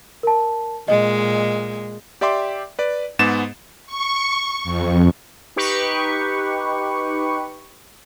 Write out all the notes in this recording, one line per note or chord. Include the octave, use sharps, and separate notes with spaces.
A#4 A5
A#2 G#3 D#5
G4 D5 E5 G5 C6 D6
B4 D5
G#2 G#3 B3 A6 E7
C#6
F2
D#4 G4 B4 C#6